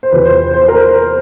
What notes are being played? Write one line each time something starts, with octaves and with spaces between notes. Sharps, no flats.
C5
E2 C3 F3 B4
C5
C5
A#4